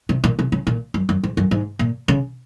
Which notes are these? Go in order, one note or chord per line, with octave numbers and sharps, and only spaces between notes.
C3
A#2
C3
C#3
A#2
F#2
F#2
G#2
F#2
G#2
A#2
C#3